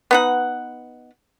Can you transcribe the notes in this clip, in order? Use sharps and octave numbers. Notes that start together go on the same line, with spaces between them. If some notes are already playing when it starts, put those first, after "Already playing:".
B3 D#4 F#5